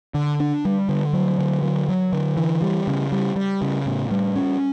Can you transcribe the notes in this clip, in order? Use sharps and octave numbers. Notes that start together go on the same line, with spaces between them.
D3
D4
G3
D3
F#3
D3
F#3
F#3
D3
E3
G3
C#3
G3
G3
C#3
A2
G3
C#4